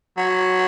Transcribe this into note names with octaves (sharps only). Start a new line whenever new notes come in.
F#3